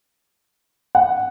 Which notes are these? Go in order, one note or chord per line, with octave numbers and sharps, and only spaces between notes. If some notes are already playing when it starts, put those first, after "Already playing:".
F#5